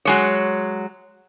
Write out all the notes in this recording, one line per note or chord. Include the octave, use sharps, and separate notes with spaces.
F#3 G#3 C#5